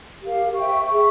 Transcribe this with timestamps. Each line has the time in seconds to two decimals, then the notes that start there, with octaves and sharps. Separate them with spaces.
0.23 G4 A#4 F5
0.55 C5 E5 G5 C#6
0.87 G#4 E5 G5 C#6